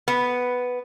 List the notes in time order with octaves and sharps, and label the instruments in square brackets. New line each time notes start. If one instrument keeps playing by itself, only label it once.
[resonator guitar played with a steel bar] B3